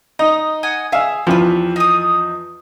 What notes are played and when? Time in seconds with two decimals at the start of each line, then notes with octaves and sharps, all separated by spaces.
0.19 D#4 D#5
0.63 D#5 F#5 G#5
0.92 G#4 E5 F5 G#5 E6
1.27 E2 E3 F3 G4 B4
1.76 D#4 D#6